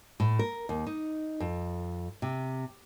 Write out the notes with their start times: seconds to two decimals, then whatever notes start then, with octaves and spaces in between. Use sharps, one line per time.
0.20 A2
0.39 A#4
0.69 D#2
0.86 D#4
1.40 F2
2.22 C3